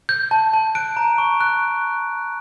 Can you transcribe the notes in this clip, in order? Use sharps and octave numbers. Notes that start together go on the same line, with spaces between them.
G6
A5
A5
F#6 D7
A#5
C#6
F#6